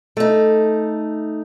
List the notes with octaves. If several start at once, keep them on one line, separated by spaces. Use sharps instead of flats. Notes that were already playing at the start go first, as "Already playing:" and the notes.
A3 D#4